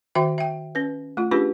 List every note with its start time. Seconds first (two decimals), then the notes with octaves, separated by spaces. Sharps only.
0.15 D#3 F#4 E5 G5
0.38 E5 G5
0.75 C#4 B4
1.17 A3 F4
1.31 C#4 D4 F4 G4 G#4 B4